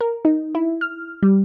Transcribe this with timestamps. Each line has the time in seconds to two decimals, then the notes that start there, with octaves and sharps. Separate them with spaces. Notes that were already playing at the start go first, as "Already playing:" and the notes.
0.01 A#4
0.25 D#4
0.55 E4
0.81 F6
1.23 G3